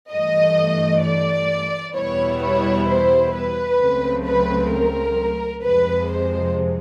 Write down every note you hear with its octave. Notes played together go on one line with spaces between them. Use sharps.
G2 E3 A3 D#5
D5
E2 B2 G3 B3 E4 C#5
C#5
C5
B4
C#2 C#3 F#3 A3 C4
B4
A#4
F2 C3 F3 G#3 B4
C5